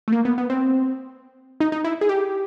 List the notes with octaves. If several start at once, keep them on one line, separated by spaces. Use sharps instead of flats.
A3
A#3
B3
B3
C4
D#4
D#4
E4
G#4
G4